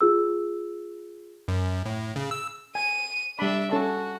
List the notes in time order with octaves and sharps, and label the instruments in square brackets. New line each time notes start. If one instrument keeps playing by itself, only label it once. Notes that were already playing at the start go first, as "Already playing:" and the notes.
[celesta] F4 G#4 E6
[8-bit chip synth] F#2
A2
C#3
E6
[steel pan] G#5 [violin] D#7
[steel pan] G3 B5 [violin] D4 E5
[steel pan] C#4 A4 A5 [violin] F#4